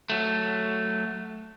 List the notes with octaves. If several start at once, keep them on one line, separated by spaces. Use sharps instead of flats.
F#3 A3